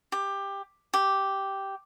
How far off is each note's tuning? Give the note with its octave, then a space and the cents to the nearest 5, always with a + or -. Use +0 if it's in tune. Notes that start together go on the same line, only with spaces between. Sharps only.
G4 +15
G4 -5